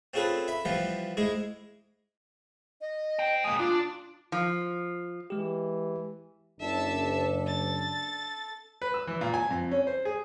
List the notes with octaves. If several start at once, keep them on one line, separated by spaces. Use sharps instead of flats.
C4 C#4 F4 G#4 A4 B4
E5 B5
E3 F3 G3 B3 F4
G#2 G#3 E4 G#4
D#5
C5 G5
G#3 A#3 D#6
D4 F4
F3
E3 G#3 G4
F#1 D4 A4 E5 A5
A6
B4
E6
E3
A#2
G#5
F2
C#4
C5
G#4